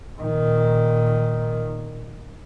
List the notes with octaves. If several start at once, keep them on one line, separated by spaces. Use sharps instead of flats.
A#2 D#3